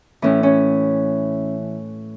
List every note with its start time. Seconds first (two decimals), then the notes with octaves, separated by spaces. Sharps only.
0.22 A2 E3 C#4
0.43 C#4